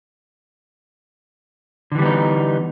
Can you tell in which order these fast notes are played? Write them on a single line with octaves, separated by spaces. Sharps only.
D3 E3 G3 B3 D#4